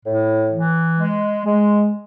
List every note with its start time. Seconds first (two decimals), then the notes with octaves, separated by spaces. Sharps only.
0.06 A2
0.52 E3
0.99 G#3
1.45 G#3